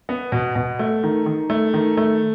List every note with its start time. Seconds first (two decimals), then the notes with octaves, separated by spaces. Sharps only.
0.09 B3
0.32 B2
0.55 B2
0.79 A3
1.03 D#3
1.26 D#3
1.50 A3
1.74 D#3
1.97 A3